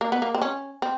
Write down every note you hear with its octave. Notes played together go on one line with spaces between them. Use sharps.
A#3
B3
A#3
C4
C#4
C4